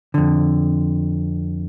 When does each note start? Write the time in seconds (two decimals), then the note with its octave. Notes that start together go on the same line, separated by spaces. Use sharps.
0.14 F2 D3